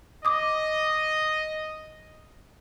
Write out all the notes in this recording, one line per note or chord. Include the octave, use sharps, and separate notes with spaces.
D#5 D6 D#6